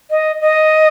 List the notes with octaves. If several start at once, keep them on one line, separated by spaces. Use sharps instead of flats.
D#5
D#5